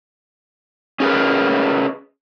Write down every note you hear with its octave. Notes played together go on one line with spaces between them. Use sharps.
C#4 G#4 A#4 B4